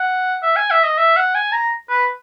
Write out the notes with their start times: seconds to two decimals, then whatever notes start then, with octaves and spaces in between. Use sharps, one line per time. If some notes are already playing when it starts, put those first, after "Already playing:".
Already playing: F#5
0.43 E5
0.56 G#5
0.71 E5
0.84 D#5
0.98 E5
1.17 F#5
1.35 G#5
1.52 A#5
1.90 B4